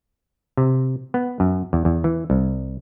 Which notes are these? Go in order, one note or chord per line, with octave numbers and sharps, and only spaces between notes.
C3
B3
F#2
E2
E2
E3
C2